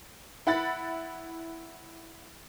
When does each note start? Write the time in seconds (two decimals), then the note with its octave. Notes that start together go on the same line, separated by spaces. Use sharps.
0.47 E4 F#5 B5 A6